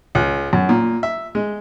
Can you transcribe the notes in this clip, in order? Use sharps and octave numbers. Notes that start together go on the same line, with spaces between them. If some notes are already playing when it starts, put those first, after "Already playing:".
C#2
F#2
A#2
E5
G#3